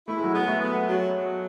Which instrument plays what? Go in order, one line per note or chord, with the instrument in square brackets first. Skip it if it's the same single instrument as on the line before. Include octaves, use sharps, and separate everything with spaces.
[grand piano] A3 [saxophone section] E4
[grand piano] G#3
F#3
[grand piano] G#3 [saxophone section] B3
[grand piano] A3
[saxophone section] B3
F#3
F#3